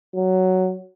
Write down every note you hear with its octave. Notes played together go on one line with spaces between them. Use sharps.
F#3